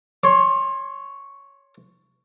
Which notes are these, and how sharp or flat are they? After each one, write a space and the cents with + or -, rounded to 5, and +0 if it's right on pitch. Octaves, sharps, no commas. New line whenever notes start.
C#5 +5 C6 +25